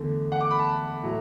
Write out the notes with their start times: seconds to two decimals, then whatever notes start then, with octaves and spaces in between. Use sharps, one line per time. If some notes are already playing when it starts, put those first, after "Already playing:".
Already playing: E2 D3 A3
0.32 F#5
0.41 D6
0.51 B5
0.59 A5
1.03 A2 F#3 A3